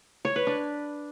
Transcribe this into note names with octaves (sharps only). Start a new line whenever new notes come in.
C#5
B4
D4